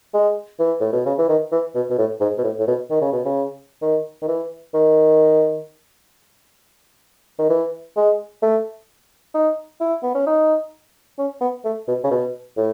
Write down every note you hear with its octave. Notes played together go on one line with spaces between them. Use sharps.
G#3
E3
A2
B2
C#3
E3
D#3
E3
B2
B2
A2
G#2
B2
A2
A2
B2
D#3
C#3
B2
C#3
D#3
D#3
E3
D#3
D#3
E3
G#3
A3
D#4
E4
B3
C#4
D#4
C#4
B3
A3
B2
C#3
B2
A2